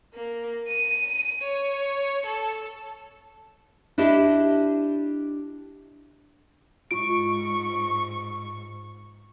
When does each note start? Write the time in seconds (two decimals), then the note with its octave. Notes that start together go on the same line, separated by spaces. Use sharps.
0.14 A#3
0.68 D#7
1.42 C#5
2.26 A4
3.98 D4 E4 G4 D5 D#5
6.91 G#2 F4 C#6 D7